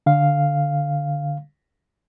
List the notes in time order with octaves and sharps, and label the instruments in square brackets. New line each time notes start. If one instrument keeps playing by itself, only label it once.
[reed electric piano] D3 F5